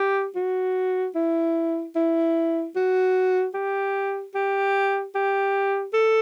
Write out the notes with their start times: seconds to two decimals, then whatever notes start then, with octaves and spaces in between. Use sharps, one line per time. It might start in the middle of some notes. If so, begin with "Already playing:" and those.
Already playing: G4
0.36 F#4
1.15 E4
1.95 E4
2.76 F#4
3.54 G4
4.35 G4
5.15 G4
5.93 A4